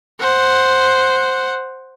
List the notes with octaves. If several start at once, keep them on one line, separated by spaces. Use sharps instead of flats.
C5 F#5